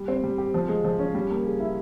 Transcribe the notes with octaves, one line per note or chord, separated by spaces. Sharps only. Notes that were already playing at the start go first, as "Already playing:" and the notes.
Already playing: G3
C4
G3
G4
F3
G#3
F3
C#4
G3
A#3
G#4
E4